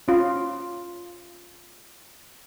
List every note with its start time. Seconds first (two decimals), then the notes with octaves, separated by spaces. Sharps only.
0.08 C#4 F4